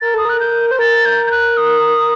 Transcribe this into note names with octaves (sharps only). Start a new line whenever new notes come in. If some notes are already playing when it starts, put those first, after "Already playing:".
A#4 A6
A4 D#6
A#4 F#6
G6
C5 G6
A#4 A6
G6
G6
F#6
D#6